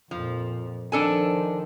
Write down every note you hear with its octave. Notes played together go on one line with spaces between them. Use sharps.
F2 A#2 F3
D#3 F3 D4 A4 G#5